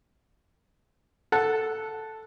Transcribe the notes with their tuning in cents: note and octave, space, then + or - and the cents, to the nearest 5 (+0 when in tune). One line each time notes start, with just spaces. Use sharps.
A4 +0 F#5 +0